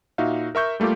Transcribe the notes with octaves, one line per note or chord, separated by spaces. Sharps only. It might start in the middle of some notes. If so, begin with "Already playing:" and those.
A#2 D#4 F#4 E5 F5
A#4 E5 C#6 G6
G3 A3 A#3 F4 G4